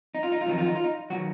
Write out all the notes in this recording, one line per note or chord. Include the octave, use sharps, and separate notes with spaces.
D#4
F4
D#4
F4
F2 D#3 F#3 D#4
F4
D#4
F4
D#4
D#3 F#3 F#4